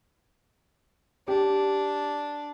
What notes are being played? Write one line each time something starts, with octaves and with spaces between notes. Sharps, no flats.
D4 G4